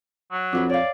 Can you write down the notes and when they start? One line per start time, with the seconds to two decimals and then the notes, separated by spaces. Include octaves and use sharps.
0.32 F#3
0.53 F2 D4 F#4 B4
0.69 C#5 D5 F5